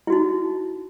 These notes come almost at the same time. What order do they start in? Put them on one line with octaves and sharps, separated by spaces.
E4 F#4 D#4